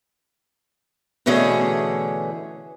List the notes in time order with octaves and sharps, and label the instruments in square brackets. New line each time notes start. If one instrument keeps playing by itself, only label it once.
[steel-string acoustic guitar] B2 D3 E3 A3 C#4 G#4